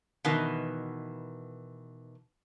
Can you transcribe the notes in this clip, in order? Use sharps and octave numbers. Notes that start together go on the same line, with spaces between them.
B2 D#3 E3